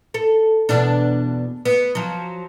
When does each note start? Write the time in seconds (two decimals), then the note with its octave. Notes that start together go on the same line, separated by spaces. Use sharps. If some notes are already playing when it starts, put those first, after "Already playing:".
0.14 A4
0.69 E2 B2 D4
1.65 B3
1.95 F3 F#3